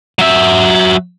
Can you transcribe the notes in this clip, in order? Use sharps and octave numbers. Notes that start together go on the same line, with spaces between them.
F#3 E5